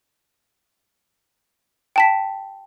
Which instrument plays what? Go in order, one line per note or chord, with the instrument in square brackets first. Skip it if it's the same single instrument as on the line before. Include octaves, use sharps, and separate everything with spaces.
[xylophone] G5 A5 B6